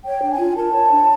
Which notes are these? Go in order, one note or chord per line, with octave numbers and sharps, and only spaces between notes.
C#5 G5
D4
G#5
F4
A#4 A5
C#5
D4